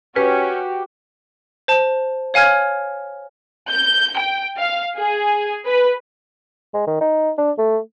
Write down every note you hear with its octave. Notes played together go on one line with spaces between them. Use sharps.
C#4 F#4 G4 B4
C5 A5
C#5 F5 G#5 F6 G#6
G6
G5
F5
G#4
B4
G#3
D#3
D#4
D4
A3